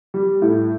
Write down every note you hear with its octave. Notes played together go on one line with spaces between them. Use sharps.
G3
A2